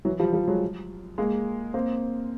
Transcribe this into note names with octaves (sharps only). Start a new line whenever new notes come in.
E3 F#3
F3 G3
F3 G3
F#3 G#3
G#3 A#3
A#3 C4